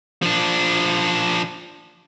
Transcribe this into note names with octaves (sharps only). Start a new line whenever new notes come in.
F3 D4